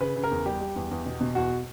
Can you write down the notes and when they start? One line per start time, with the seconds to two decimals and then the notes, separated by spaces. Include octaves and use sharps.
0.01 C#3 B4
0.16 C#3
0.24 A#4
0.31 E2
0.46 G3 G4
0.61 G3
0.76 E2
0.91 E2
1.06 B2
1.21 B2
1.35 E2 F#4